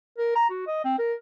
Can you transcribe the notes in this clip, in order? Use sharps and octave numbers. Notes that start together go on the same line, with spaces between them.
A#4
A#5
F#4
D#5
C4
A#4